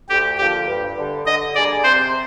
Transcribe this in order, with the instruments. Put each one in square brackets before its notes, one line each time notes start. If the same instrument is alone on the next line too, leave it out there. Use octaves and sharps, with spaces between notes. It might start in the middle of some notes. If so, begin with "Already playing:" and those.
[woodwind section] D2 [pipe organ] G4
[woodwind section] D3 F3 A#3 [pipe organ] G4
[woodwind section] G2
D3 G3
[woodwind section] D3 [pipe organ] D#5
[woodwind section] G3 A#3 D4 G#4 [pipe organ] D5
[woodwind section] C3 [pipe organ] C5